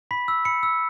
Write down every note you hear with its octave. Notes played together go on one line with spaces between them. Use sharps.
B5 B6
E6
B5 C#7
E6